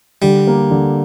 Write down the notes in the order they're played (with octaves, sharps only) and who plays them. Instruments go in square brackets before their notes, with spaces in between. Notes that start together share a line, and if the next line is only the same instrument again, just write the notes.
[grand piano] D3 [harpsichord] G3
[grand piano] A#3
D3